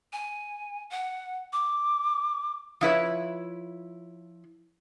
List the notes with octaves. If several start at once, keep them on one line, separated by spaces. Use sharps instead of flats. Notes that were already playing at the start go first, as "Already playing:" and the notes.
G#5
F#5
D6
F3 E4 B4 C#5